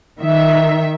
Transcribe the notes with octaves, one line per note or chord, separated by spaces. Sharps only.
D#3 E5